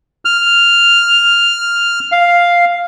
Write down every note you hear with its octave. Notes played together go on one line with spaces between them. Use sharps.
F6
F5